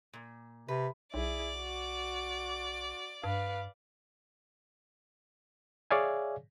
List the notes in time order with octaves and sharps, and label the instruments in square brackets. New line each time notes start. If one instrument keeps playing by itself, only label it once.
[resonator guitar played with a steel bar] A#2
[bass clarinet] C3 [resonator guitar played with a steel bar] B4
[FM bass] B1 [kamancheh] E4 G#4 [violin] D5
[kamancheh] F#4 D6
[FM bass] G2 [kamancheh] B4 F5
[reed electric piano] G#4 C#5 D5 E5 F5 G#5